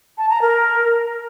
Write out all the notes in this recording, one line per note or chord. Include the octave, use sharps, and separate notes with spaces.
A5
A#5
A#4